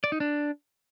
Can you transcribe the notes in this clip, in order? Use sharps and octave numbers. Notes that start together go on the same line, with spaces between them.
D5
D#4
D4